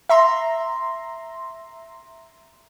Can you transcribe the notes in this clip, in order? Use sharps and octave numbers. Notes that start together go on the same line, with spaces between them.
E5 A#5 C6